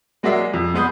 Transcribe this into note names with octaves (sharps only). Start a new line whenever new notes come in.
F#3 G#3 A#3 F#4 D5 E5
F2
G#3 B3 D#6 G6